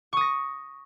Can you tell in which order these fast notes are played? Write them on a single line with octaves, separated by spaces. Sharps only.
C#6 D#6 A#6